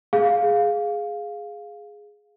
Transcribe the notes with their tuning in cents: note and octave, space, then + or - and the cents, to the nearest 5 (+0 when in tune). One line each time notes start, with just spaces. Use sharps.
G#4 +0 F5 +5